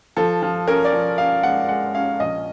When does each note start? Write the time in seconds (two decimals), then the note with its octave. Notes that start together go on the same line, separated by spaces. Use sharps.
0.17 F3 A4
0.42 F3
0.68 C#4 A#4
0.85 D5
0.93 F3
1.18 C#4 F5
1.43 G#3 F#5
1.69 G#3 F#5
1.94 C#4 F5
2.20 A#1 D#5